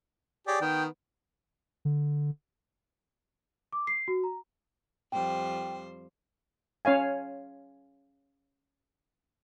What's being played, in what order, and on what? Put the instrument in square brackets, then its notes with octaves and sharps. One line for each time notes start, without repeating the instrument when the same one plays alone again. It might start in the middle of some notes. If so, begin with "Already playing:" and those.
[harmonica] G4 G#4 C#5 [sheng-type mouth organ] D5
[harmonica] D#3 B3 [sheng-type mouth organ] G5
[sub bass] D3
[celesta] D6
C7
F#4
A#5
[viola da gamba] F2 G3 C5 [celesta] G5
[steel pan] C#4 C#5 F5 G#5